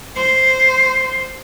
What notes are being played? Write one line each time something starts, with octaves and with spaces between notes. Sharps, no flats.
C5